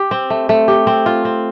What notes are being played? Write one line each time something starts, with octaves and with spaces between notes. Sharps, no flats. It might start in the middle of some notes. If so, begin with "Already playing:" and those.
Already playing: G4
C4
A3
A3
G4
C4
F4
C4